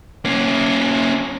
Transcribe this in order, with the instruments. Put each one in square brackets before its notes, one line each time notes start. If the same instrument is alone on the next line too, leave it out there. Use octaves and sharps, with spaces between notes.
[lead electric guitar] A#3 C#4